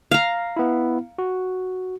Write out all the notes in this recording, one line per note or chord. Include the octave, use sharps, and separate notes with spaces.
F5 A#5
B3 E4
F#4